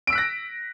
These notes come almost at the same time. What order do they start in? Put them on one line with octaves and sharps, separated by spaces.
D7 E6 B6 F#6 A#6